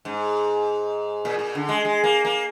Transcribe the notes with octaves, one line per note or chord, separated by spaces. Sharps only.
G#2
A#2
A#2
D3
G#3
G#3
A#3
A#3